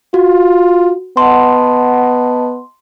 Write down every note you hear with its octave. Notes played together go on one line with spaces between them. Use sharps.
F4 F#4
B3 D#5 F#5 A5 C6